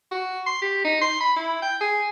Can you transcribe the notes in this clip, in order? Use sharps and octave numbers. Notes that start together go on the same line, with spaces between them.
F#4
C6
G4
D#4
C6
B5
E4
G5
G#4